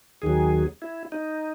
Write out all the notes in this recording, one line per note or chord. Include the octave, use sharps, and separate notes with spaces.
D#2 D#3 F#3 G#4
E4
D#4